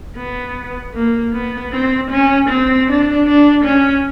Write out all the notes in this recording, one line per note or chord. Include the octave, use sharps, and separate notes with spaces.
B3
A#3
B3
C4
C#4
C4
D4
D4
C#4